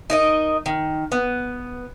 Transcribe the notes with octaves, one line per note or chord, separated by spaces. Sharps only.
D#4 A#4 D#5
D#3
B3